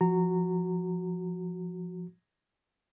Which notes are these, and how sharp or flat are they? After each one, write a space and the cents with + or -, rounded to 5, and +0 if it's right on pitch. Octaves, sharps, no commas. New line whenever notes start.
F3 +0 F#4 +0 A#5 -20